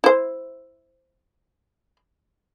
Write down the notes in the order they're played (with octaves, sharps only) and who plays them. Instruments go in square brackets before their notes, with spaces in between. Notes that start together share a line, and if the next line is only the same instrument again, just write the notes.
[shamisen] E4 C5